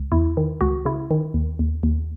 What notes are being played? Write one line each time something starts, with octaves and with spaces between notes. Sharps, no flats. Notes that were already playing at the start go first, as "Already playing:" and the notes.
Already playing: C#2
E2 E4
D#3
C#2 F#4
C#3 E4
D#3
D#2
D#2
D#2